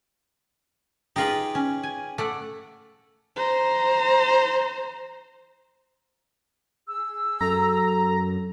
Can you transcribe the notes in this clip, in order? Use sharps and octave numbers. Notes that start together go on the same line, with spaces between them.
D#4 F4 G4 G#4 B4
C#4
G#5
A3 D5 F#5
C5 A#5
G#4 E6
F#2 A4 A#5